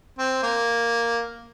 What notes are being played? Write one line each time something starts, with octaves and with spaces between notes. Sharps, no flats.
C4
A#3